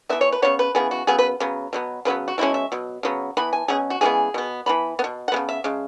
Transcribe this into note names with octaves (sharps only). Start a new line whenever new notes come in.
E3 B3 E5
C#5
B4
C#3 G#3 B3 C#5
B4
C#3 E3 B3 G#4
F#4
C#3 F#3 B3 G#4
B4
C#3 F#3 B3
B2 F#3 B3
C#3 F#3 B3 B4
F#4
B2 G#3 C#4 E4
E5
B2 F#3
C#3 F#3 B3
E3 B3 B5
G#5
B2 F#3 C#4 G#4
F#4
C#3 E3 G#3 B3 G#4
B2 B3
E3 B3 B5
B3
B2
F#5
C#3 G#3 B3
E5
C#3 G#3